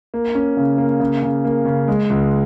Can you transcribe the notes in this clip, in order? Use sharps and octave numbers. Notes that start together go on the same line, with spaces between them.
A#3
C#4
C#3
A#3
C#3
C#3
A#3
C#3
G#3
C#2